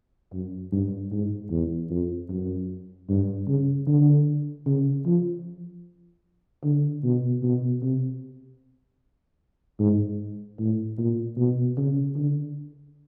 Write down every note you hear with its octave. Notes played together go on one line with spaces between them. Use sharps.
F#2
G2
G#2
E2
F2
F#2
G2
C#3
D3
C#3
F3
D3
B2
B2
C3
G#2
A2
A#2
B2
C#3
D3